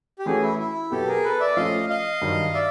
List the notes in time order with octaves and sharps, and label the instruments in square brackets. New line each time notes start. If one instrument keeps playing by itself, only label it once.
[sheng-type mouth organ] G4
[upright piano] E3 A3 C#4 F#4 [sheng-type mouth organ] G#4
[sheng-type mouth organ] E4
E4
[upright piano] B2 F#3 B3 [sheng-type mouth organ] G4 A4
[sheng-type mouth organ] G#4 A#4
A4 B4
D5 E5
[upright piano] F3 A3 C#4 F4 [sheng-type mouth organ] D#5 F5
[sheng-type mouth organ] D#5 F5
[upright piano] G2 D#3 F#3
[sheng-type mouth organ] D5 E5